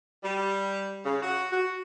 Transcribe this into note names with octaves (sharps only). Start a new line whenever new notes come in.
G3
C#3
F#4
F#4